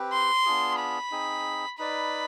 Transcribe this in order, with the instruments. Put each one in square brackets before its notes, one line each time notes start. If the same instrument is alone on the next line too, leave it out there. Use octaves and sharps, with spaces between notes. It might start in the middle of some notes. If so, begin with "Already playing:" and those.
Already playing: [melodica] C4 G4 B4
[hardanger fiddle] C6
[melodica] B3 D4 F4 G#4
[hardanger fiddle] B5
[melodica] C4 D#4 G#4
[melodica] D#4 B4 D5 [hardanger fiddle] B5